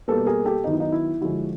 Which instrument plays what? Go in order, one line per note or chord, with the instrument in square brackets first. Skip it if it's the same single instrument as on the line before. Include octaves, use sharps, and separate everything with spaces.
[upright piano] B2 G3 A#3 A4 B4
G#4 A#4
G4 A4
D#3 F#3 B3 D#4
E4
D#4
E4
D3 F3 G#3 E4 F#4